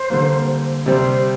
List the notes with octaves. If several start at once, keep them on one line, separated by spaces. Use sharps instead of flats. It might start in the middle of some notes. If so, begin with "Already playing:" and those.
Already playing: C5
D3 G3 A#3
C3 G3 C4 C5